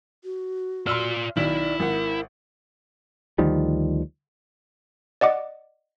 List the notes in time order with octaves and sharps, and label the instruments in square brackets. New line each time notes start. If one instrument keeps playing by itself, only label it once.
[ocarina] F#4
[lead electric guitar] F4 D5 [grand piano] C6 E6 F6
[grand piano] B1 D#3 [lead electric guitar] E4 [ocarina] D5
[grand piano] G#1 F#5 [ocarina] A#4
[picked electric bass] D2 D#3 F3 G3
[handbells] D5 D#5 F#5 D6